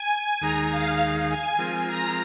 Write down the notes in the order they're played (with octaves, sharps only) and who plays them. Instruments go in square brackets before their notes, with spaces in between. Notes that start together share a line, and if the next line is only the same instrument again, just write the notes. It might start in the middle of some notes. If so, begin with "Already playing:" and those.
Already playing: [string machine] G#5
[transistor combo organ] D#2 D#3 G#3 D#4 G#4 [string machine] A#5
[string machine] F5
G#5
[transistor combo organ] F3 G#3 C4 F4 A#4
[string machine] A#5